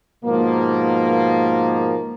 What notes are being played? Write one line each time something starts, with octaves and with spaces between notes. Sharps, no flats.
G#2 B2 F3 A#3